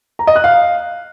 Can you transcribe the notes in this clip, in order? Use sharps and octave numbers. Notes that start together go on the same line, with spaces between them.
A#5
D#5
F#6
F5